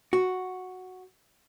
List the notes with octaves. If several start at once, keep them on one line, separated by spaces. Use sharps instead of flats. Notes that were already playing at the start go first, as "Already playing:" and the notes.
F#4